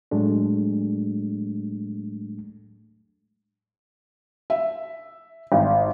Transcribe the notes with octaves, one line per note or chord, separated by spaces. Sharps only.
A2 F#3 G#3 A3 D4
E5
G#1